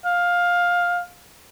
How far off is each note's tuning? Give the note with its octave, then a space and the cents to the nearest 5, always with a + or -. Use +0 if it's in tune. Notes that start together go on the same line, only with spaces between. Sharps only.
F5 +15